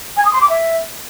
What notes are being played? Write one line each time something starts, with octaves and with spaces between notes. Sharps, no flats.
G#5
D#6
C6
D6
E5